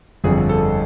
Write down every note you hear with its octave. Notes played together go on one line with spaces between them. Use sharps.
G1 F2 D3 G#4
A4